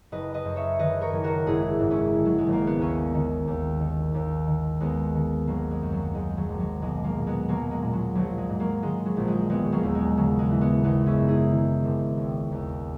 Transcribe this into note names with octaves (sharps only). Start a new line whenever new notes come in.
F#1 B4 D#5
B4 D#5
F#2
C#5 E5
D#3 B4 D#5
A#4 C#5
F#1
F#4 A#4
G#1 E4 G#4
G#2
C#4 E4
D#3
F#3
G#3
G#1
A#3
B3
D#2 A#3 C#4
D#3
D#2
D#3
D#2
D#3
D#2 G#3 B3
D#3
G#1 F#3 A#3
G#3
F#2
F#3
D#3 G#3
F#3
G#1
F#3
B1 G#3
F#3 A#3
A#2
G#3 B3
B1 F#3 A#3
G#3
A#2
F#3
A#1 F#3
G#3
G#2
F#3 A#3
D#3 G#3
F#3
A#1
G#3
E1 G#3 B3
F#3 A#3
D#2
G#3
C#3 F#3
G#3
E3
G#3 B3
G#1 G#3 B3
C#4 E4
F#2
E4 G#4
D#3
G#1
E1
D#2